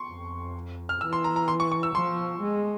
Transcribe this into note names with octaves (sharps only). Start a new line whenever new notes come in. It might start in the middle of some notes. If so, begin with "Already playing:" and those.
Already playing: C6 C#6
F2
F6
E3 E6
C6
A#5
A#5
C6
C#6
C#6
E6
F3 C6
G#3